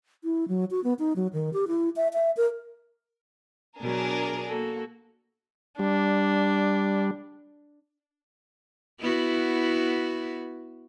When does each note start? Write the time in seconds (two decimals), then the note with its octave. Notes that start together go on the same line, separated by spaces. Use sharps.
0.24 E4
0.48 F#3
0.71 F#4
0.84 B3
0.99 D#4
1.16 F#3
1.33 D#3
1.53 G4
1.68 E4
1.96 E5
2.13 E5
2.37 A#4
3.80 B2 F#3 D4 G#4 A#4
4.47 A#3 F#4 A4
5.79 G3 D4
9.00 B3 E4 F#4